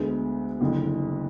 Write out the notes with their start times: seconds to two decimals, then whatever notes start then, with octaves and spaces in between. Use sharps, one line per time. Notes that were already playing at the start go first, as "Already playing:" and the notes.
Already playing: D2 D3 G#3 B3
0.61 F#1 F2 D3